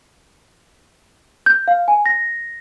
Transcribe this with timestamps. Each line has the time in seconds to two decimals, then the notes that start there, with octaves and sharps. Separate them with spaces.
1.46 G6
1.68 F5
1.88 G#5
2.06 A#6